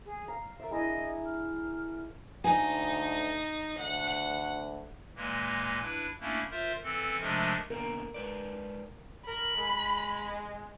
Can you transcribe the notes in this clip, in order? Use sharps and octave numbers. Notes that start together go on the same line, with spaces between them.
G#4
F5 A#5
A#4 D5 E5
D4 E4 G#4 D#5
F6
D2 D#4 G#5
D2 F#5
A#2 E3 G#3 A#3
D4 E4 B4
A3 A#3 C#4 D4 E4
F4 A#4 C5 E5
E3 C4 A4
C3 F3 G#3 A3 D4 A#4
B2 D3 A#3 A#4
G#3 B4 D5
A#4 B5
G#3